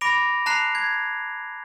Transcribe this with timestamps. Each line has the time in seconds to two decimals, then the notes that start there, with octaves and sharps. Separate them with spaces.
0.01 B5 D6 A#6 D7 F7
0.46 A5 A#5 F#6 C7 F7
0.75 G#6